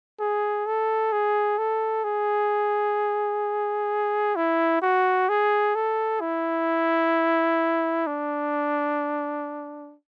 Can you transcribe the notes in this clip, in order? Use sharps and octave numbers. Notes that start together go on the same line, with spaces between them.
G#4
A4
G#4
A4
G#4
E4
F#4
G#4
A4
E4
D4